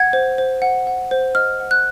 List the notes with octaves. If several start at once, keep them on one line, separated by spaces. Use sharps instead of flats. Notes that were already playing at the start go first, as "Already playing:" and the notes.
Already playing: F#5 G#6
C5
C5
F#5
F#5
C5
D#5 F6
F#5
F#6